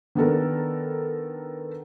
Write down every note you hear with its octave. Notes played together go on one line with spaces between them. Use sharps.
D#3 B3 D4 A4 A#4